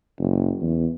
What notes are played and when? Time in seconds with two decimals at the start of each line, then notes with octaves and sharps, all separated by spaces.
0.19 F#1
0.61 E2